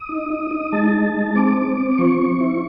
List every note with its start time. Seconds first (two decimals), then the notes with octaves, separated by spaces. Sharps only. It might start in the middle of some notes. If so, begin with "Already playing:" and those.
Already playing: D#6
0.09 D#4
0.30 D#4
0.51 D#4
0.72 G#3 A5
0.94 D#4
1.14 G#3
1.35 C4 D6
1.57 C4
1.78 C4
1.98 F3 C#6
2.19 C4
2.41 E4